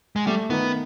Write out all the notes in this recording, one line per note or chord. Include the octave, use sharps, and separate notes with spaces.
G#3
G3 A3
D#3 B3